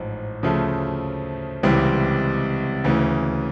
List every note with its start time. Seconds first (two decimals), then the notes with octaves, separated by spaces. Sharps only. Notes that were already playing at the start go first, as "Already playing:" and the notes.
Already playing: A1 G#2 F3
0.43 D2 C#3 F3 A3
1.63 C#2 C3 E3 G3 C4
2.84 D2 C#3 E3